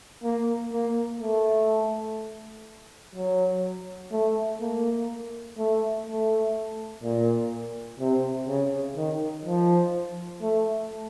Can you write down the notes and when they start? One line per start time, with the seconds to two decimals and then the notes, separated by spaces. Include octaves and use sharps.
0.24 A#3
0.72 A#3
1.21 A3
3.15 F#3
4.12 A3
4.61 A#3
5.58 A3
6.06 A3
7.03 A#2
8.00 C3
8.48 C#3
8.96 D#3
9.46 F3
10.42 A3